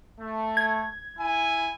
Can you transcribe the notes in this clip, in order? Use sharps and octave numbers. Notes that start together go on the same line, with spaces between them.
A3
G#6
E4 G#5